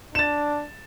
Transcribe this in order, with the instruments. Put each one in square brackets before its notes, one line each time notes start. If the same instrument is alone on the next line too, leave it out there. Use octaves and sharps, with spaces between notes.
[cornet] D4 [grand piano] A6 E7